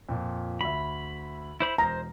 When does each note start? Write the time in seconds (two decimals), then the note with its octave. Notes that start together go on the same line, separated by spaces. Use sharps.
0.09 F2 A#2
0.61 D2 E5 B5
1.60 E4 C5 B5
1.78 E1 C5 A#5